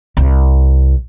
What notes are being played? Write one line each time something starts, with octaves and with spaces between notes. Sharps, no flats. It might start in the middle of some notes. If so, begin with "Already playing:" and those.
C2